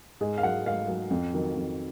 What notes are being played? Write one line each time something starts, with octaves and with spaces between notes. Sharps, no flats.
G#2 G#4
F5
F#3 F#5
G#2 F5
F#3
F2
D#3 F#3
F2